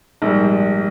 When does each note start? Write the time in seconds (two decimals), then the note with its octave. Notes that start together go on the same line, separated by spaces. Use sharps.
0.22 A#1 G#2 G3